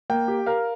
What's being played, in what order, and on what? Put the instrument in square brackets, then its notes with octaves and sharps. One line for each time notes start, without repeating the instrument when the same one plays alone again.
[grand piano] A#3 [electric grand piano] G5
[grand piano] G4
[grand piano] A#4 [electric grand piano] F5